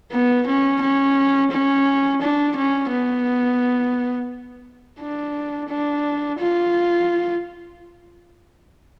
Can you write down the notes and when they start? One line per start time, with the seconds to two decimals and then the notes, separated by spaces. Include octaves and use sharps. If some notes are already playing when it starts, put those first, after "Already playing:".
0.11 B3
0.46 C#4
0.81 C#4
1.51 C#4
2.21 D4
2.56 C#4
2.90 B3
5.00 D4
5.69 D4
6.39 F4